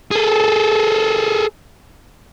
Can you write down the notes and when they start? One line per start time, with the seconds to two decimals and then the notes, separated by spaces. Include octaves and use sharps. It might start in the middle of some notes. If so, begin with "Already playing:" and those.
0.11 G#4 A4